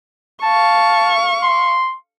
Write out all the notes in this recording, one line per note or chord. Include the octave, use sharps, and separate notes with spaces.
F5 A5 C#6
C6